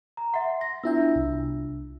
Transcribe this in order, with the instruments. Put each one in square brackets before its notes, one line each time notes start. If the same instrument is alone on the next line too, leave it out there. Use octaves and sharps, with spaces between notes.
[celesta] A#5
[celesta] E5 F#5 [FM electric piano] C6
[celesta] A#6
[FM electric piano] B3 E4 E5 [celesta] D4 F4 E6
[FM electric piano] C2